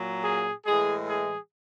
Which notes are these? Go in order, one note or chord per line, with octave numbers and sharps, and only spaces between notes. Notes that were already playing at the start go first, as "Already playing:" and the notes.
Already playing: A#2 F#3
G#4
A2 E3 G#3 G#4
G#4